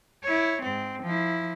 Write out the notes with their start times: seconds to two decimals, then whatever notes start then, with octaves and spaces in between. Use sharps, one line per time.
0.23 E4 C#5
0.62 G#2 C4
1.03 F3 E4